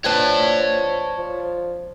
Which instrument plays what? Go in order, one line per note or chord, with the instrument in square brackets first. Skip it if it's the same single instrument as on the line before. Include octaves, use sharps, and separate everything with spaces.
[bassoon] F3 [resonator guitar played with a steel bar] D4 B4 G5 [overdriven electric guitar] C#5 A5
[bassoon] F3